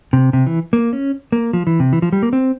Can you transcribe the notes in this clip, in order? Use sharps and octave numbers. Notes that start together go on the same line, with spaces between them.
C3
C3
E3
A#3
C#4
A#3
F3
E3
C3
E3
F3
G3
A#3
C4